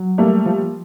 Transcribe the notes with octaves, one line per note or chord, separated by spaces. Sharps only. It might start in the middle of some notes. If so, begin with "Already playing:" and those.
Already playing: F#3
G3 A3 A#3
F3